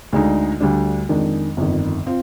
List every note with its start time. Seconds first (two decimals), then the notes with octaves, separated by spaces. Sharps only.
0.13 D2 D3 G#3 D#4
0.60 D2 D3 G3 D4
1.09 F2 D#3 G#3 D4
1.57 G1 F2 D#3
2.07 C4 F4